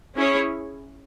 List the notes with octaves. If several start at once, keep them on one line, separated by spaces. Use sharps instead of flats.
C#4 E4 G#4 C#5